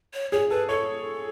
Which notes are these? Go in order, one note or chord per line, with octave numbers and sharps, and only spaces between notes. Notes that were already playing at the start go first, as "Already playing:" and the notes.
C#5
G#4 C#5
A4 B4
A4 C#5